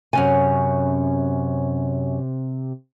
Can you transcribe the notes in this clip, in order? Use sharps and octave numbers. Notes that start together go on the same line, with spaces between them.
F#2 C3 C#4 G#5